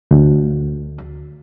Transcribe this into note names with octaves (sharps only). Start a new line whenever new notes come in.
D2